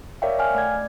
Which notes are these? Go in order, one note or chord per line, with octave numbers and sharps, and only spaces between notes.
A#4 C#5 D5 E5 F5 G5
F5 G5 G#5 F6
A3 D5 G#6